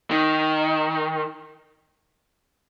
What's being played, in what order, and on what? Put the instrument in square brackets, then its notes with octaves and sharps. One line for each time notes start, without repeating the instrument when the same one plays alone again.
[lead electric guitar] D#3